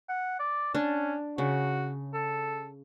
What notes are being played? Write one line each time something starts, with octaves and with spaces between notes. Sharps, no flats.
F#5
D5
C#4 D4
C#3 F#4
A4